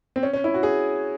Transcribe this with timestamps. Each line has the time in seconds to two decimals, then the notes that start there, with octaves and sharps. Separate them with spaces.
0.16 C4
0.23 C#4
0.33 C#4
0.44 E4
0.54 F#4
0.63 G#4